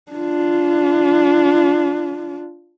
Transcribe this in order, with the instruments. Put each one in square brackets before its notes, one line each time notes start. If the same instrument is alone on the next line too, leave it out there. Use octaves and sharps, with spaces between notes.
[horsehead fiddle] D4 F4